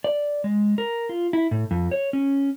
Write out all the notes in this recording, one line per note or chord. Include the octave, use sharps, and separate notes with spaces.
D5
G#3
A#4
F4
E4
A2
F2
C#5
C#4